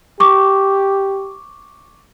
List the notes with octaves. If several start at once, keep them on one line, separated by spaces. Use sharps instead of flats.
G4 C#6 D6